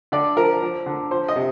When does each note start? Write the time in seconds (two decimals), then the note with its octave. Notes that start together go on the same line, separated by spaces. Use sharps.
0.12 D3 D5
0.37 F3 A#4
0.62 F3
0.86 D3
1.11 F3 C5
1.28 D#5
1.36 C3